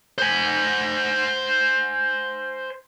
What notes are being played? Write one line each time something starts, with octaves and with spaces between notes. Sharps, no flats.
C5 G#5